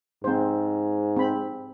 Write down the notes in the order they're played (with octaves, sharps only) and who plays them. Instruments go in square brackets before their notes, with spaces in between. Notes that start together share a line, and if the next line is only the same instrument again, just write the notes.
[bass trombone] G#2 [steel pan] C4 C5
[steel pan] C4 B5